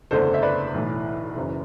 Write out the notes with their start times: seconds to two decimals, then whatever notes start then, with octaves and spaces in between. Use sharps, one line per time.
0.11 F#1 E2 D3 A3 D4 A4 C5
0.34 E5
0.42 B4 D5
0.74 B1 A2 E3
1.36 F#1 F#2 E3